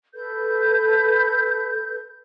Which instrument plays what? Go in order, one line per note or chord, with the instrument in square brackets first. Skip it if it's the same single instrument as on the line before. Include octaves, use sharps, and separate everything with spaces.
[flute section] A4 B4 G6